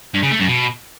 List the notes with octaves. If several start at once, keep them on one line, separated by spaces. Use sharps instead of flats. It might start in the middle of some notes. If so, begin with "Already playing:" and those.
G2
C#3
A3
F#2
B2